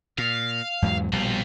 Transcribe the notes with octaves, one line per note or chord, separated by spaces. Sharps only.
A#2 F5
E2 G#2 F#3
A#1 B2 G3 C4 F4